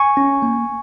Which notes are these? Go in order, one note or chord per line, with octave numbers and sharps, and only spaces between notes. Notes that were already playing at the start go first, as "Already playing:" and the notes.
Already playing: G#5 C#6
C#4
A#3